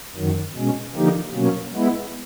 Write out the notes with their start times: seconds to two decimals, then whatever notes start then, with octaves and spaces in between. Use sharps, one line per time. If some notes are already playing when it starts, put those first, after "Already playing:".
0.16 F#2 D#3 F#3
0.56 B2 G#3 C#4
0.95 D3 F3 A#3 D#4 G4
1.34 B2 F#3 A#3 C#4
1.74 G#3 B3 E4